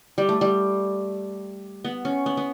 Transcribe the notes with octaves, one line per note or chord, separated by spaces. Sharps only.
G3
A3
G3
B3
C#4
B3
B3